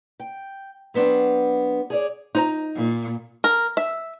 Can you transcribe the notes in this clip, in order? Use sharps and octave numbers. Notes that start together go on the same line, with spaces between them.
G5
F#3 B3 C4 D4
G#4 C#5 D5
D#4 F4 C5 A#5
A#2
A#4
E5